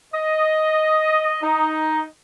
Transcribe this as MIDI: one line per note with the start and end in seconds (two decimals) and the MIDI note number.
0.14 1.37 75
1.43 2.05 63